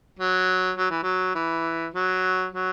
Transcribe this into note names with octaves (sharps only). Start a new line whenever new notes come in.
F#3
F#3
E3
F#3
E3
F#3
F#3